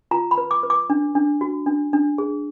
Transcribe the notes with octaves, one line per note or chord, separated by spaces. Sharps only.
F4 A#5
B5
B4
D6
B4
D6
D4
D4
F#4
D4
D4
G#4